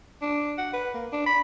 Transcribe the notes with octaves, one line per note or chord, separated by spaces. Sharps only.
D4
F#5
B4
A#3
D4
B5